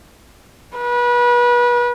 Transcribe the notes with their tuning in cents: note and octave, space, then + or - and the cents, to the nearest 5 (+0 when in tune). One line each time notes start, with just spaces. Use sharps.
B4 -30